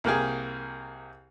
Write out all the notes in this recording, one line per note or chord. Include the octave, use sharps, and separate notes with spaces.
C2 A#3 G4 G#4